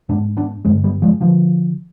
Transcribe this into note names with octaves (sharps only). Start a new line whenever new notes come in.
G#2 B3 D4
B3 D4
G2 D3 G#3 C4
G3 B3
F3 G#3
D3 F3